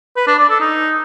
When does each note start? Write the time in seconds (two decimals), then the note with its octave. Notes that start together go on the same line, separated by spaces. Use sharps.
0.16 B4
0.27 D4
0.38 D5
0.50 A4
0.61 D#4